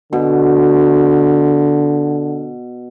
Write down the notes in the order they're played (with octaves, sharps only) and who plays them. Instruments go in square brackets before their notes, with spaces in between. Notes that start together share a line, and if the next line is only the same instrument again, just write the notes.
[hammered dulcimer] B2 [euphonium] D3